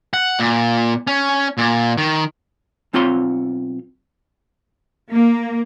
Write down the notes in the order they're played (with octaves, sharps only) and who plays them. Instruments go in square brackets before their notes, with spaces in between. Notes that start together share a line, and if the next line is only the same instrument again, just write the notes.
[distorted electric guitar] F#5
A#2
C#4
A#2
D#3
[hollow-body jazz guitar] B1 C4 F4 C#5 C6
[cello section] A#3